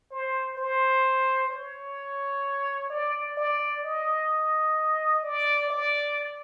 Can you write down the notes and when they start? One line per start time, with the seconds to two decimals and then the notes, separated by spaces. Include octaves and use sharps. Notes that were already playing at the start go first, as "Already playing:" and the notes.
0.11 C5
0.57 C5
1.50 C#5
2.90 D5
3.37 D5
3.83 D#5
5.23 D5
5.70 D5